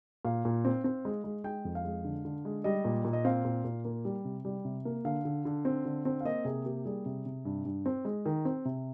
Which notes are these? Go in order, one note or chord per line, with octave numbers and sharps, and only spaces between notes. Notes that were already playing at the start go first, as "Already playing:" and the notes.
A#2 F5
A#2
C4
C4
G#3
G#3
G#3 G5
F2
F5
G#3
D3
D3
G#3
G3 D#5
A#2
A#2
D#5
C4 F5
A#2
A#2
A#3
G3
C3
G3
C3
A#3
D3 F5
D3
D3
C4
D3
C4
F5
A#3 D#5
C3 G#4
A#3 G4
G3 G#4
C3
C3
G2
G2
C4
G#3
D#3
C4
C3